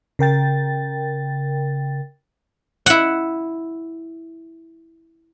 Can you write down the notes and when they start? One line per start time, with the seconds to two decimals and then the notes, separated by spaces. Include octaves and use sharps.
0.19 C#3 A#4 G5 A6
2.86 E4 F#5